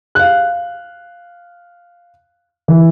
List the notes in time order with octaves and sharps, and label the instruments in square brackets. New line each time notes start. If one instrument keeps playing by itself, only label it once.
[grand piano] F5 F#6
E3